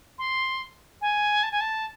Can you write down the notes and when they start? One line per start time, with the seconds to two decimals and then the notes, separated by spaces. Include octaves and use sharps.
0.18 C6
1.01 G#5
1.43 A5
1.52 G#5
1.61 A5